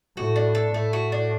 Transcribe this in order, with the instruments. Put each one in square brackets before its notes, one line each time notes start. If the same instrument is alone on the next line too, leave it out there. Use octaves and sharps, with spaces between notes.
[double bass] A2 [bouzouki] F#4
[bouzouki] D4
A4
[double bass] A2 [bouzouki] A3
[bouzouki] F#4
D4